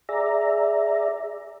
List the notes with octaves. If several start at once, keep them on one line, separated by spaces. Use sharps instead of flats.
G#4 D5 E5 A#5